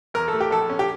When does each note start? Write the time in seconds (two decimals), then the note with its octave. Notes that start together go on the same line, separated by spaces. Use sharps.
0.14 E2 A#4
0.28 A3 A4
0.41 G4
0.51 A#1 A4
0.70 C#4
0.79 G4